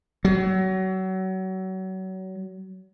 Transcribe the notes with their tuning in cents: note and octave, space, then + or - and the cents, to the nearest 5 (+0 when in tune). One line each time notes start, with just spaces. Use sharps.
F#3 +30